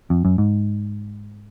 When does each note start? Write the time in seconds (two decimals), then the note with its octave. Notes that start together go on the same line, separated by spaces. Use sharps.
0.10 F2
0.25 F#2
0.38 G#2